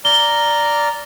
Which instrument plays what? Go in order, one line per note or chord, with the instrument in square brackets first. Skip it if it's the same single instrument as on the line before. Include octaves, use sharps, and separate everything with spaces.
[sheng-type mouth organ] D5 A#5 F6 [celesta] G7